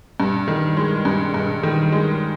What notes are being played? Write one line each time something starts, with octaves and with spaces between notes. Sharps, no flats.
G2
D#3
G#3
G2
G2
D#3
G#3